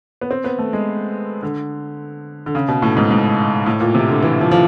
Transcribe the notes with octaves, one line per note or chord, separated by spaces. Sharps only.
B3
C4
B3
A3
G#3
D3
D3
C#3
B2
A2
G#2
G#2
A2
A#2
C3
D3
E3
F3
F3